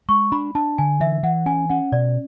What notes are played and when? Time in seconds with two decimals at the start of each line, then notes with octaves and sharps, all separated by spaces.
0.09 G#3 C#6
0.32 D4 B5
0.55 D4 A5
0.78 D3 G#5
1.00 E3 E5
1.23 E3 F#5
1.46 C#4 G#5
1.70 C#4 F#5
1.92 B2 D5